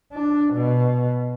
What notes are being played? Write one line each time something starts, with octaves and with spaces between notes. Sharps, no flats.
D4
B2